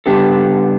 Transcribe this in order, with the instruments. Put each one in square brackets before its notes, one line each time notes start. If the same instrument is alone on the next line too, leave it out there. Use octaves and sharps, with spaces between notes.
[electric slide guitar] C#3 G3 B3 D4 A4 [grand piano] G4